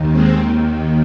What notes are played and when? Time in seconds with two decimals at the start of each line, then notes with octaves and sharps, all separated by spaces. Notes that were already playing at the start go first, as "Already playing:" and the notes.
Already playing: D#2 D#3
0.12 G#3 C4